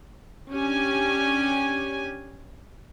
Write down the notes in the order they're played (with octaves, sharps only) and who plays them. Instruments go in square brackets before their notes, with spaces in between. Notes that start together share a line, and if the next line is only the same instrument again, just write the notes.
[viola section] C#4 D4 G4 G#5